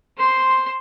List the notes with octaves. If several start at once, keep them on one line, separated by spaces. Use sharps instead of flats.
C5 C6